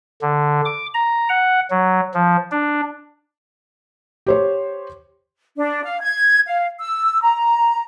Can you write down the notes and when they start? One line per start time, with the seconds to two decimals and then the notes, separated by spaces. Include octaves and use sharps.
0.22 D3
0.66 D6
0.94 A#5
1.29 F#5
1.71 F#3
2.14 F3
2.51 D4
4.27 G4 C5 C#5
5.57 D4
5.84 F5
6.01 G#6
6.47 F5
6.80 E6
7.22 A#5